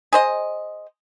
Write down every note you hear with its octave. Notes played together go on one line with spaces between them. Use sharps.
G#4 C5 D#5